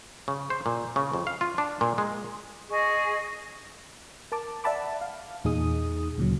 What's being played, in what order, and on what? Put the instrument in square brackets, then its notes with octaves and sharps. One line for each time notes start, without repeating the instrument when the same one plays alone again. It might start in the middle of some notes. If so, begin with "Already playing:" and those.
[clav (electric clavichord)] C#3
C5
A#2
C#3
F2
F5
F4
D4
A#2
G#3
[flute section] G#4 D#5 G#5 C#6
[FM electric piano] A#4 A5 D6
D5 E5 F#5 A5 B5 D6
F5
E2 A#2 D#4 G#4 D#6
D2 A#2 C#3 F#3